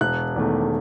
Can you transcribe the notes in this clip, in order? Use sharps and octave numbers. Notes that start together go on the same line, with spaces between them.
E1 F#6
E2 D#3 A3